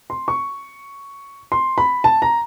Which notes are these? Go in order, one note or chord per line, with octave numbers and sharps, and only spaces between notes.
C6
C#6
C6
B5
A5
A#5